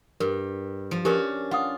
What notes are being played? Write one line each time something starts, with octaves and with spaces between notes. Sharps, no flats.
G2 A#4
F3
C#4 D4 F#4 G4 A#4 B4
F4 F5 F#5 D#6